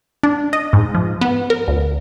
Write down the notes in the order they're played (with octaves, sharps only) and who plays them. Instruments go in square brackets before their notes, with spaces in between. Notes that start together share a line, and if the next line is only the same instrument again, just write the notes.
[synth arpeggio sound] D4
D#5
G#2
F3
B3
A#4
D2